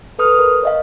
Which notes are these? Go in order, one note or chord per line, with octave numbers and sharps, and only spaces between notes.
A4 B4 D#6 F6
A#4
C#5 D#5 F5